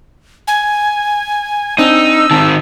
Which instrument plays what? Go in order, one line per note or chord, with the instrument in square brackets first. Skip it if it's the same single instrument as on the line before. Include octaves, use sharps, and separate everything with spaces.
[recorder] G#5
[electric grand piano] C4 D4 [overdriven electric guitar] D#4 [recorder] E6
[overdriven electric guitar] D#3 C4 [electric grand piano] A5